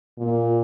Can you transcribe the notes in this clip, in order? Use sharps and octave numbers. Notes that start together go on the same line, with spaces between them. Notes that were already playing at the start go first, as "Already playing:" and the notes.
A#2